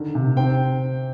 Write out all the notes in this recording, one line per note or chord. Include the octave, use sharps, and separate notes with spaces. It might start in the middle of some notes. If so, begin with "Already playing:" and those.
Already playing: D3 D#3
C3
C4 G5